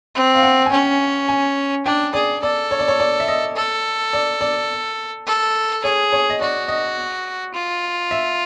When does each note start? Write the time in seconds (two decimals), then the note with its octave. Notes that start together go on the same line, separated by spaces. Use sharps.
0.15 C4
0.35 F5
0.43 F#5
0.66 G#5
0.72 C#4 G5
1.29 G#5
1.85 D4 G5
2.14 G#4 D5
2.42 A4 D5
2.71 C#5
2.80 D5
2.88 C#5
3.00 D5
3.20 E5
3.28 D#5
3.56 A4
4.13 D5
4.41 D5
5.27 A4
5.84 G#4 C#5
6.13 C#5
6.30 D#5
6.41 F#4 D5
6.68 D#5
7.54 F4
8.11 E5